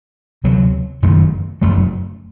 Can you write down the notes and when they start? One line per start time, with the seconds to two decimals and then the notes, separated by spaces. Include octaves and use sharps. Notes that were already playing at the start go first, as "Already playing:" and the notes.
0.44 D2 C3 F#3
1.02 F#1 F#2 D#3 A3
1.62 F#1 F#2 F#3 A3